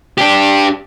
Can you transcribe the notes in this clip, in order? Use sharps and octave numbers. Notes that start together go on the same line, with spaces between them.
D4 G4